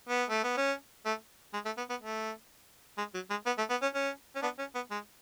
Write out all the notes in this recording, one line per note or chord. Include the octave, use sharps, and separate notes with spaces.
B3
A3
B3
C#4
A3
G#3
A3
B3
B3
A3
G#3
F#3
G#3
B3
A3
B3
C#4
C#4
C#4
B3 D4
C#4
B3
G#3